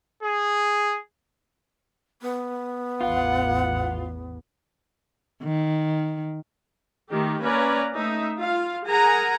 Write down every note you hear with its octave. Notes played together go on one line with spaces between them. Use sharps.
G#4
B3
A1 E2 F4 F#5
D#3
D#3 A3 G4
A#3 C#4 B4 D5 A#5
A3 D#4 E5
F4 F5
G#4 A#4 F#5 G#5 A#5